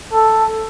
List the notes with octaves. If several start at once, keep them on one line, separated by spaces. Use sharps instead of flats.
A4